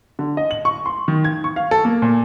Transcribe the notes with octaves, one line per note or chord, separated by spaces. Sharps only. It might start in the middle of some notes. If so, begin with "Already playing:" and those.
D3
D#5
F#7
C#6
C6
D#3
G#6
C#6
F5
A4
A#3
A#2